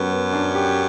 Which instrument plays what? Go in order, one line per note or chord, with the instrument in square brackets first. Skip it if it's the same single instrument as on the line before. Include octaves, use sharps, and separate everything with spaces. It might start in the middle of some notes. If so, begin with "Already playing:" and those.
Already playing: [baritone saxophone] F#2 [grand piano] B3 G4
[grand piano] B3
D4
G4